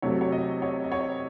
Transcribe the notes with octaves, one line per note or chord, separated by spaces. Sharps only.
C3 F#3 A3 C#5
C#5
D#5
C#5
D#5
C#5